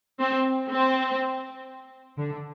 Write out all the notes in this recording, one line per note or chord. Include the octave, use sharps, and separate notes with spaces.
C4
C4
D3